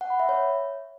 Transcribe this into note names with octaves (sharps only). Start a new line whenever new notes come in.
F#5
B5
E5
C#5